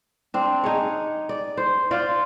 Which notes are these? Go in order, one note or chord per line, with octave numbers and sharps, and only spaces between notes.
C4 D4
D#4 G#4 C#5
D5
C5
F4 C5 D5 F#5